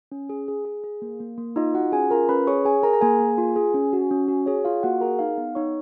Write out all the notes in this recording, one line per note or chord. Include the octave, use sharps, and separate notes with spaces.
C#4
G#4
G#4
G#4
G#4
A#3
A#3
A#3
D#4 F4 D#5
F4 F#4 F#5
C#4 G#4 G#5
F4 A#4 A#5
C#4 B4 B5
G#4 C#5 C#6
G#4 G#5
G#4 A#4 A#5
A#5
A#3 G#4 G#5
A#3
F4
G#4
C#4
F#4
C#4
F#4
G#4 C#5
F4 F5
A#3 F#4 F#5
G#4 A#4 A#5
D#4 F5 F6
B3
D#4 C#5 C#6